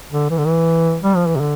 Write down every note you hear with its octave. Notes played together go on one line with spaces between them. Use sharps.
D3
E3
D3
E3
G3
F3
E3
C3
D3